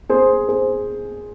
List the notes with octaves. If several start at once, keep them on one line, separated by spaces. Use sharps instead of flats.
G#4 C5
G#4 C5